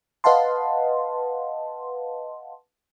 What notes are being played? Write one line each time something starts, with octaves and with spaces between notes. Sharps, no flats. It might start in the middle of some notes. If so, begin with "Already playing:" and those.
B4 D#5 F5 F#5 A5 C6